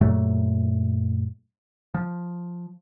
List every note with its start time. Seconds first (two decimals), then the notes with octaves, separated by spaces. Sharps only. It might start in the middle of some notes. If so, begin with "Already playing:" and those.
0.01 F#2 A#2 F#3 A3
1.94 F3